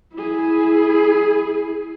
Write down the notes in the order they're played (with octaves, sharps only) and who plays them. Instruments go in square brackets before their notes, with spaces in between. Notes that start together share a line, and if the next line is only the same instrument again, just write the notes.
[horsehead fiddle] E4 G#4